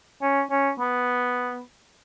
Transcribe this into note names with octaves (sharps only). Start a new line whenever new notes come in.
C#4
C#4
B3